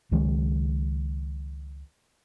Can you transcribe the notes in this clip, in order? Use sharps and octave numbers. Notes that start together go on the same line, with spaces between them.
C#2 D#3 F#3 G#3